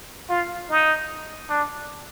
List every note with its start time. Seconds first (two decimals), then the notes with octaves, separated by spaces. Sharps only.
0.29 F4
0.70 D#4
1.50 D4